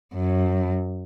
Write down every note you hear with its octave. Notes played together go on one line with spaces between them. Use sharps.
F#2